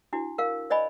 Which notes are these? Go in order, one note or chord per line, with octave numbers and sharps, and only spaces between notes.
D4 E4 F#4
A#4 F5
C5 D5 D#5 G#5 B5